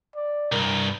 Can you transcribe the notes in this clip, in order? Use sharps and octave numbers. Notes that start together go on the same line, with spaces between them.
D5
C2 G2 A#4